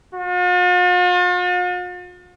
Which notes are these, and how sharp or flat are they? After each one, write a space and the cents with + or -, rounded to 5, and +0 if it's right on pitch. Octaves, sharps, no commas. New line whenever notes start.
F4 +45